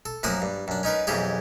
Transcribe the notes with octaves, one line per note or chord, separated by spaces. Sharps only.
A4
F#2 F3 A#3 F#4 F#5 D#6
G2
F#2 D4
C#4 D#4 A#4 B4
B1 F2 E3 C#4 G4 G#4